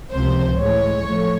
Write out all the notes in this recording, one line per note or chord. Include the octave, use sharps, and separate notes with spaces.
C#2 C3 F3 C5
A2 E3 G#3 C#5
A2 F3 A3